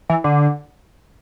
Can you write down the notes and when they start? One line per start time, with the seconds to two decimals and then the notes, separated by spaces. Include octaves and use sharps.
0.09 E3
0.24 D3